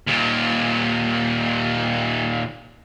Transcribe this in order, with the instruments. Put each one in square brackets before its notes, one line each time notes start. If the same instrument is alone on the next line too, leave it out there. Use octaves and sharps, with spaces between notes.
[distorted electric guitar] D#2 A#2